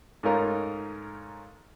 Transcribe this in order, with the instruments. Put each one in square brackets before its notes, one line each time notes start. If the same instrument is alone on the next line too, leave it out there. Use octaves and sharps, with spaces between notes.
[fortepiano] G#2 A3 C#4 D#4 F4 A#4